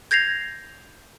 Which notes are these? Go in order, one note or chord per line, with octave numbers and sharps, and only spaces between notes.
G6 G#6 A#6 C7 F7